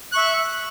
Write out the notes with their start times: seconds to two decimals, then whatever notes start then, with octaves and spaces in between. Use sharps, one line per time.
0.12 F#6
0.15 C#6
0.17 E5